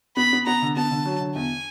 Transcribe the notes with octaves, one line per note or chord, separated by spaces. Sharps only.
B3 B5
B3
B3 A#5
D3
B3 A5
D3
F#3
D3
E2 G#5